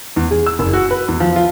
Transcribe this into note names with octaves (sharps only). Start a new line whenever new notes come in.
E2
G#4
E6
F#1
F#4
B4
E2
F3
F4